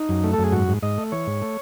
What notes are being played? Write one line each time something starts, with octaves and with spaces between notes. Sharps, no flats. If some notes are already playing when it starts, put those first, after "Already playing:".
Already playing: D#4
F#2
A3
A4
F#2
G#4
G#2 F#4
G#2
G#2 D#5
A3
E3 C#5
G#2
A3